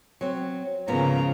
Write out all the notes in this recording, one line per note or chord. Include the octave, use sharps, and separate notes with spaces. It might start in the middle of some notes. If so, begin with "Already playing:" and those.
F#3 C4
G#2 C#3 F3 A#3 B3 A#5